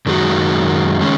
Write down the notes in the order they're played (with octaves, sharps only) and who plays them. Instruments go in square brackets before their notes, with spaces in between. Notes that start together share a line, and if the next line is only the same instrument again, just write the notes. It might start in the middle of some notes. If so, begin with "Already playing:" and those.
[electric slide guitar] F#2 D#3 G#3 D#4 F#4
D#3 G#3 C#4